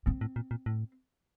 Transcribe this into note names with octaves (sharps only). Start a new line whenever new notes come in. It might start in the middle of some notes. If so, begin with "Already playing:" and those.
G#2 C4
A2
A#2
A#2
A2